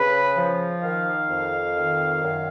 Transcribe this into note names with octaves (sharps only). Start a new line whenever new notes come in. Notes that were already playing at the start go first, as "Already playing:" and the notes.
Already playing: C#3 B4
F3
D#3 F5
F2
D#3
F#2